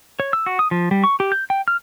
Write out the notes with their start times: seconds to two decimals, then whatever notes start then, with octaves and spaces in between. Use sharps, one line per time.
0.20 C#5
0.33 E6
0.46 F#4
0.59 D#6
0.71 F3
0.91 G3
1.04 C#6
1.20 G4
1.32 G6
1.50 G5
1.68 F6